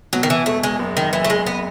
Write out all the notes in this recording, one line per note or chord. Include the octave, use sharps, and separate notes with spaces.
B2 F#3
D#3
E3
E1 A3
G#3
F#1
D#3
F#1 E3
A3
G#3
B3